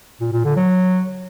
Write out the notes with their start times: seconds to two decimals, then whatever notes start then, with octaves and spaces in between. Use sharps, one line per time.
0.21 A#2
0.33 A#2
0.44 D3
0.56 F#3